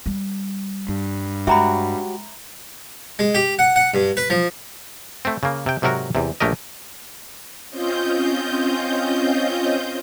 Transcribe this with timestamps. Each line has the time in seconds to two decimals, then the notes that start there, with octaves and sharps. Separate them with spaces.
0.06 G3
0.89 G2
1.47 G#3 F#4 G4 C#5 E5 A#5 B5
3.19 G#3
3.35 G4
3.59 F#5
3.76 F#5
3.94 G2
4.17 B4
4.30 F3
5.25 A3 C4
5.43 C#3 A#3
5.66 C3 G5
5.82 G#2 C3 F#3 F#4 A#4 A#5
6.15 E2 C3
6.40 A#1 A3 G4 A#4 D#5
7.70 C4 C#4 F4 D#5 G6